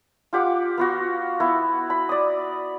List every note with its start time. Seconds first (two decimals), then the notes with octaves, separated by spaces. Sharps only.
0.33 F4 G4 F#5 D6
0.78 B3 F4 F#4
1.40 B3 E4
1.90 B5
2.09 D5 D#6